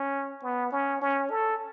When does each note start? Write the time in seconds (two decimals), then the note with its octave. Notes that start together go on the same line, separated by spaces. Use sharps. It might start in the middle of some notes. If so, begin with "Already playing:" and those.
Already playing: C#4
0.43 B3
0.72 C#4
1.02 C#4
1.31 A4